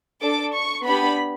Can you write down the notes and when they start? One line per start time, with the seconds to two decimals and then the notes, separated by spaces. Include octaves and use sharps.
0.22 D4 A4 D6
0.54 C#6
0.85 B3 D4 G4 B5